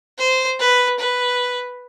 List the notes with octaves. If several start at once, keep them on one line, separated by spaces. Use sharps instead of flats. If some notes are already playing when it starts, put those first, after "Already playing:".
C5
B4
B4